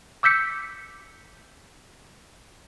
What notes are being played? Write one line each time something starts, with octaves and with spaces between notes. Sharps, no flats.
D6 E6 G6 B6 C#7